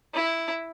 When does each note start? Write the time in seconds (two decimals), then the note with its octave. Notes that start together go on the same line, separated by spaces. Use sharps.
0.14 E4